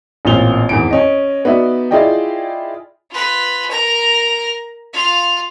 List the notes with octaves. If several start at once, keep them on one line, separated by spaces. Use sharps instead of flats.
A1 A#2 C4 F4 F7 G7
G#1 E2 D7
C#4 D#5
B3 D#4 F#4 D5 E5
E4 F4 G#4 D5 D#5 G5
F4 B4
A#4 A#5
F4 F5